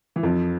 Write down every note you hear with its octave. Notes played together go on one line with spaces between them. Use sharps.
E3
F2 F3